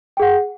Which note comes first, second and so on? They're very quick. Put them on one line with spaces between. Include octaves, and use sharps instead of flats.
G5 G#4 F#5